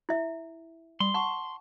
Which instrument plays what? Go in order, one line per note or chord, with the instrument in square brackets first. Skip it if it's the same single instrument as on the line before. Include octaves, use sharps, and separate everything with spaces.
[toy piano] E4 E5
[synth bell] G3 [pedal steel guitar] C6
[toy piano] F#5 [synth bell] A5 C#6